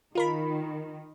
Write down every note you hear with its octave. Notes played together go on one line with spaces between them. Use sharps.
D#3 F4 A#4 B5